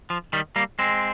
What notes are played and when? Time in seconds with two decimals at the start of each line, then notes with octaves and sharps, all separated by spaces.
0.10 F3
0.33 D#3 G3
0.56 G3 A#3
0.79 G#3 C4